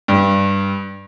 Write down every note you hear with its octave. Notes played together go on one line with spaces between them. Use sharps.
G2